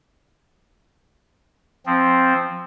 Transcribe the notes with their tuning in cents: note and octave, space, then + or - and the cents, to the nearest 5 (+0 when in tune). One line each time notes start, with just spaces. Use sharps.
F3 +0 C4 +0